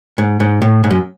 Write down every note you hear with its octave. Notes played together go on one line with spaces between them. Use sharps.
G#2
G#2
A2
G#2
F#2